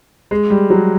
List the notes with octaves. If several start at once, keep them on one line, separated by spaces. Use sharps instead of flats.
G#3
G3
F#3